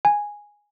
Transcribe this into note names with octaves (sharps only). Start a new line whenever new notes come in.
G#5